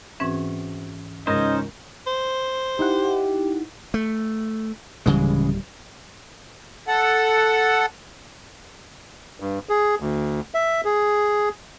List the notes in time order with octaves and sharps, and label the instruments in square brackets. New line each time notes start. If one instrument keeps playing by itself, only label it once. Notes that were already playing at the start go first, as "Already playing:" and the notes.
[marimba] G#2 E3 C#4 [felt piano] C4 F#4 B4
[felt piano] C#2 G#2 [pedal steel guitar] C#4 D#4 C5 [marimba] A#4 [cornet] D#5
[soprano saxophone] C5
[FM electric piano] D#4 E4 F#5 [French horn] G4
[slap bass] A3
[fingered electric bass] D1 G3 [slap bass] C#3 E3 G#3
[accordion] A4 F#5
[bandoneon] G2
G#4
D2
E5
G#4